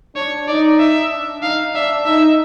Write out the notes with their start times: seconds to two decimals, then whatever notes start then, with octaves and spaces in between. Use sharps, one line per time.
0.16 D4 C#5
0.47 D#4 D5
0.79 E5
1.11 D4
1.43 D#4 F5
1.75 D4 E5
2.06 D#4 E5